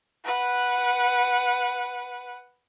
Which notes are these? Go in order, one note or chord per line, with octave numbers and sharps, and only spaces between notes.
B4 F#5